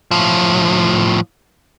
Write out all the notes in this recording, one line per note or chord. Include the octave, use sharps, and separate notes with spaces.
A2 F3